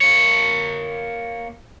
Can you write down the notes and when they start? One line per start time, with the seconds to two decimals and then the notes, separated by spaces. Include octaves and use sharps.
0.01 A#3 C#5